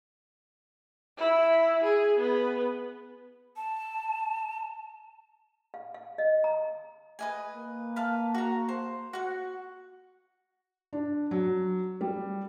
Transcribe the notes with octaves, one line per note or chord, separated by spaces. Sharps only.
E4
G#4
B3
A5
F5
F5
D#5
A#5
B4 D#5 G#5
A#3
B4 F5 A5
F#4 A#5
C5
F#4 F#5
D4
F#3
G3